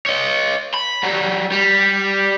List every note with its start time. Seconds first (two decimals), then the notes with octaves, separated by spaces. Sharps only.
0.06 C#5 D#5
0.74 B5
1.03 F#3 G3
1.52 G3